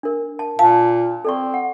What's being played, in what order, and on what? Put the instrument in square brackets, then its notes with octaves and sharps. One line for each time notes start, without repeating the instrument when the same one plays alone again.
[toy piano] D4 A#4
A5
[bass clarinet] A#2 [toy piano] F5 [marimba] A5
[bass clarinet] C4 [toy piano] A4 D5 C#6
[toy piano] F#5